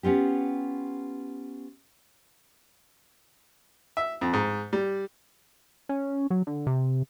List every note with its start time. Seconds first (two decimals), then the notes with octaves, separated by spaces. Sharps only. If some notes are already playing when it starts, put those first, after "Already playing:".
0.03 B3 C#4 F4 G4
3.97 E5
4.21 F2
4.33 G#2
4.73 G3
5.89 C#4
6.30 F#3
6.47 D3
6.67 C3